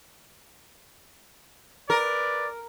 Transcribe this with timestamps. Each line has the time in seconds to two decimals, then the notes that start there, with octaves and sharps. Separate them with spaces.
1.90 A#4 B4 D5